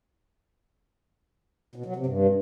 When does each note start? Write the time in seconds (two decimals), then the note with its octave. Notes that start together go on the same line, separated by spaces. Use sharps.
1.76 B2
1.86 F#3
1.96 C3
2.06 G2